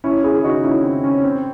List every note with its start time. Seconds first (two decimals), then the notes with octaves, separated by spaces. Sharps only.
0.04 C#4 E4
0.24 E4 G#4
0.44 D#4 F#4
0.64 C#4 E4
0.84 C4
1.04 C#4
1.24 C4